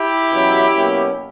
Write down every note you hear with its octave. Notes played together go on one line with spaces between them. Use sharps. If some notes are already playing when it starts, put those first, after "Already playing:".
Already playing: E4 G4
E2 B2 F#3 C#4
B2 F#3 A#3 C#4